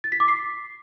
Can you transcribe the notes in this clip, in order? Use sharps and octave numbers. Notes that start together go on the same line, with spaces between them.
A6
B6
D6
C7